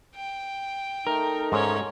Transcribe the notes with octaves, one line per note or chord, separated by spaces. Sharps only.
G5
A3 D#4 A#4
G#2 C#4 C#5